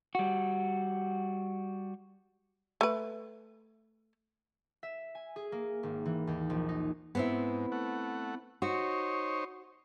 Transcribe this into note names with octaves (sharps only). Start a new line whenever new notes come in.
G3 F#4
A3 B4
E5
G#5
G#4
A#3
G#1
E3
D#2
A#1
D#4
G#2 B3 C4 E4
A3 F#5
D#4 F#4 C5 C#5